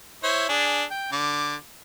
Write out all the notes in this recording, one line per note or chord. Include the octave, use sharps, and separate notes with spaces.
E4 C5 C#5
D4 G#4
G5
D3 D6